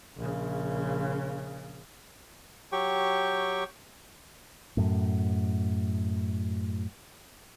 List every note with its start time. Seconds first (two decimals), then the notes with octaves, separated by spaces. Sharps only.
0.18 A#1 C#3
2.72 F#3 G4 G5 C#6
4.77 F#2 A2